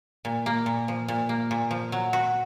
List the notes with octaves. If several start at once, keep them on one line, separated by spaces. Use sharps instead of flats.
A#2
A#3
A#2
F3
A#2
A#3
A#2
F3
F#3
F#4